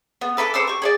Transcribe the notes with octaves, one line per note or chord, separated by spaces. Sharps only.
B3
A4 B4 E5 D6
A4 C5 D6 E6
G4 C#6
G#4 C#5 D5